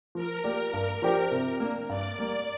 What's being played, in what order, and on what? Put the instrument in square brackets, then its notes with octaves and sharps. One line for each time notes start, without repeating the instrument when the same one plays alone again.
[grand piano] F3 [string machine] A#4
[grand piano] A#3 G4 D5
G2
F3 D4 G4 C5
C3
A#3 D4
[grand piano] G2 [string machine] D5
[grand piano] G3 A#3